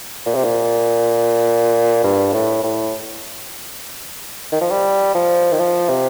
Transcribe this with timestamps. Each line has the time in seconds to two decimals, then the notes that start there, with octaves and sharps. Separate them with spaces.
0.26 A#2
0.35 C3
0.44 A#2
2.03 G2
2.33 A2
2.63 A2
4.52 D#3
4.61 F3
4.71 G3
5.14 F3
5.52 D#3
5.59 F3
5.89 C3